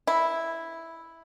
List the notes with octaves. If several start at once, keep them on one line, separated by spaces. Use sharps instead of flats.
E4